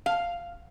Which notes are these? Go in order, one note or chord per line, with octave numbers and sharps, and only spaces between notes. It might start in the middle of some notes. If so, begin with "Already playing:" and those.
F5